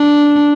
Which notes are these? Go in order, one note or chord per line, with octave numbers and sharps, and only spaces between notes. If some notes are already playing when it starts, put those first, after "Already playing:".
Already playing: D4